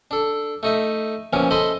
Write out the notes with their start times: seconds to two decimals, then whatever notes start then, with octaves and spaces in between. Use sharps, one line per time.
0.11 D4 A4
0.63 A3 D#4 E5
1.33 A#2 E3 F3 B3 C#4
1.51 A4 C5 D#5 A5 B5 C6